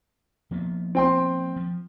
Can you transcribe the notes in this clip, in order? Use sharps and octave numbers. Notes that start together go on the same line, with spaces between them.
F3 A#3 B3
C4 G5 C6
F3